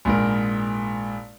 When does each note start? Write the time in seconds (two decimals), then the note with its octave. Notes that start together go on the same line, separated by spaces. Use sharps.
0.05 A#1 G#2 A#4